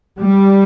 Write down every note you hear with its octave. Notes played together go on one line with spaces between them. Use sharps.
G3